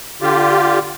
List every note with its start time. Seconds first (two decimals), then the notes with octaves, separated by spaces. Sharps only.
0.22 D3 F4 G4